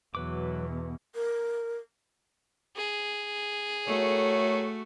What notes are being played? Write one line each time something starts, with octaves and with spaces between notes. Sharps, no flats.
E2 B2 F#3 B4 D6
A#4
G#4
A2 A3 F#4 A#4 C#5